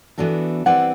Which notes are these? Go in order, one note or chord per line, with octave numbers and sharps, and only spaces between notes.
E3 B3 D4 F#4 A4
G3 C4 E4 B4 D5 F#5